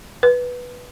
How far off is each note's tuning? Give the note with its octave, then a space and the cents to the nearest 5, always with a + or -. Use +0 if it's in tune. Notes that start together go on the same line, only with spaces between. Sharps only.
B4 -5